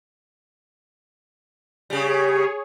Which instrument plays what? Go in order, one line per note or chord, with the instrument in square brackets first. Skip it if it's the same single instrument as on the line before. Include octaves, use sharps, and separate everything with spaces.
[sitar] C#3 G3 [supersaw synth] G#4 C#5